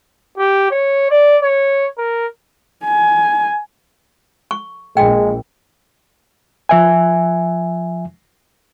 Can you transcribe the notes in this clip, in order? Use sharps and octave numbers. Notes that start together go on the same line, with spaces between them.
G4
C#5
D5
C#5
A#4
G#5
C#6
A#1 G#3 G5
F3 E5 G#5